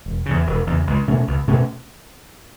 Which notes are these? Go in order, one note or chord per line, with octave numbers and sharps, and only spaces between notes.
E1
E2 C#3
E1
E2 C#3
C#2
B2 A3 C#4
C#2
B2 A3 C#4